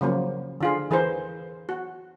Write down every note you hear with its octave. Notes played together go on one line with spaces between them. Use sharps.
C#3 F3 F#3 A#3
D3 F4 G#4
E3 G#4 A#4 C5
F#4